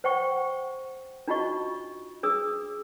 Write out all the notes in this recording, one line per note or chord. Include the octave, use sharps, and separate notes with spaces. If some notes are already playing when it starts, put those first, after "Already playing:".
C5 F#5 G5 C#6
D4 D#4 F4 F#4 D#5 C#6
D4 G#4 D#6 E6